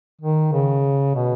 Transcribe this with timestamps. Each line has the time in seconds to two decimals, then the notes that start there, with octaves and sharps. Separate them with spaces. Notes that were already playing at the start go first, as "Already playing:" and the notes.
0.22 D#3
0.53 C#3
1.15 B2